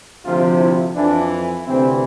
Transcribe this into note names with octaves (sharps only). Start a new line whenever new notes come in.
D2 C3 F3 F4
E4
F2 E3 D4
D2 C3 E3 C4